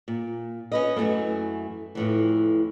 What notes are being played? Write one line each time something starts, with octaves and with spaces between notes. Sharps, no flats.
A#2
C#4 B4 D#5
F#2 E3 F3 A3 A#3
F2 A2 E3